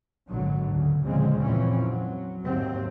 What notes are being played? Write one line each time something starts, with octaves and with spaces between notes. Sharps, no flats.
G#1 B2 D3 F#3
D2 C#3
D2 A#2 C#3 F3 G#3 C4
F2 A#2 E3 C4 C#4
F#3
D#2 G#2 C3 F#3 C4